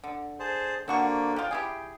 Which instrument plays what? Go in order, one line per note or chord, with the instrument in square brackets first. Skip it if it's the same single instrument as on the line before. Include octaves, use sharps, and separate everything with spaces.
[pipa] D3
[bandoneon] G#4 C5 A5
[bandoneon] D3 A#3 D4 [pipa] C4 F#4 C#6
[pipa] F3 F4 [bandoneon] G5
[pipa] E4 G4 G#4